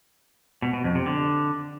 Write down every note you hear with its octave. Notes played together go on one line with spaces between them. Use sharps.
B2
B2
F2
C3
D3